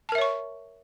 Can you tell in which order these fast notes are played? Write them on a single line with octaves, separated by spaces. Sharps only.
A5 A#4 E5 C#5 C#6